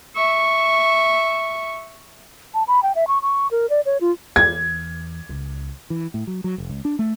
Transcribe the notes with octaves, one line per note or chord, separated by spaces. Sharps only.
E5 C#6
A5
B5
G5
E5
C#6
C#6
A#4
D5
C#5
F4
E2 G#6
C#2
E3
A2
F#3
F#3
F1
C#2
D4
A3